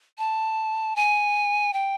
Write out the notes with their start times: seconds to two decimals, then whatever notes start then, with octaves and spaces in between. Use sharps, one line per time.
0.18 A5
0.96 G#5
1.73 G5